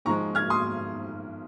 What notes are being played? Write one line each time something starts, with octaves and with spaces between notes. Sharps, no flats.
G#2 F3 G#3 A#5 C#6
F6 G#6
C6 D#6